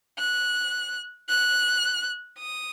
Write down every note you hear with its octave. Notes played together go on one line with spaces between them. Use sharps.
F#6
F#6
D#6